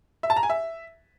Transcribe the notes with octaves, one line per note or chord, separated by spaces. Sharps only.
E5
A5
A#5
G#5
E5